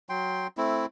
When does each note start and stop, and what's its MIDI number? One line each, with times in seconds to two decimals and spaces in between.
0.09 0.47 54
0.09 0.47 79
0.09 0.47 84
0.57 0.86 57
0.57 0.86 60
0.57 0.86 64